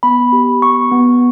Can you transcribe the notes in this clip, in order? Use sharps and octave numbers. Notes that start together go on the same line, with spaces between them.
B3 B5
G4
B3 C#6
B3